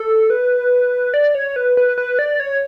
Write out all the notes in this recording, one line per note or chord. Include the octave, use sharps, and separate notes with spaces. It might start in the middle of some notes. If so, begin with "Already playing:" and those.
Already playing: A4
B4
D5
C#5
B4
B4
B4
D5
C#5